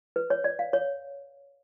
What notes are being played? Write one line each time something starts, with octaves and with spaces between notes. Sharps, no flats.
B4
C#5
D5
F5
C#5